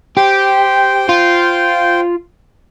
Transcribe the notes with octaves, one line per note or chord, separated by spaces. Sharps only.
G4 C5 G5 C6
F4